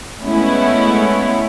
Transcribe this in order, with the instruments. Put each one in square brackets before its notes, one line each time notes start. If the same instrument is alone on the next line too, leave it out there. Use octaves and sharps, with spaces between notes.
[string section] G#3 A3 B3 C#4 E4